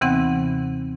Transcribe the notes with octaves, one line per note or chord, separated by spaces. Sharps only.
D#2 C3 E3 B3 C4 F#5